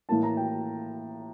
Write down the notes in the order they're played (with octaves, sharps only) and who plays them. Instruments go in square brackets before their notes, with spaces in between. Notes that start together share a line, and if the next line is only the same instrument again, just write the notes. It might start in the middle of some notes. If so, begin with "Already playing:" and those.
[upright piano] A2 E3 A#3 A5
A#5
G5